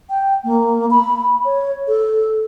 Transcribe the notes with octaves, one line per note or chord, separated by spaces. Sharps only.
G5
A#3
B5
C#5
A4